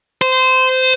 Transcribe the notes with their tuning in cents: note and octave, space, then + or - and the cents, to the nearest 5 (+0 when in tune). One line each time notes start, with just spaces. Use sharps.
C5 -20